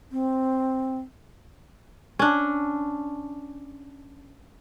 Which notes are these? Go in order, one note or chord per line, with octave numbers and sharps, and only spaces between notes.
C4
C#4 D4